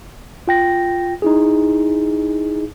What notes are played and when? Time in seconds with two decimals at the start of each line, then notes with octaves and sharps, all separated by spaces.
0.48 F4 G5 A#6
1.22 D#4 E4 G#4